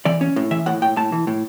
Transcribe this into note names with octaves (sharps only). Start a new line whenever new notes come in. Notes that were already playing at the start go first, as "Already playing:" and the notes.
E3 D5
C#4
A2
E3 E5
A2 F#5
A2 G5
A2 A5
E3
A2